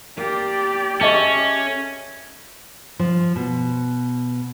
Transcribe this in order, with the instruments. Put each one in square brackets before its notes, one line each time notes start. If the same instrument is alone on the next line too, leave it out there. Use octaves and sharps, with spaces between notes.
[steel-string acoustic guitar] A#3 [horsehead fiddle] G4 D5
[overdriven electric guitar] C#4 [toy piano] G#4 D#5 C#6 [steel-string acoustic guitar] A4 E5 A5
[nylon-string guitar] F3
B2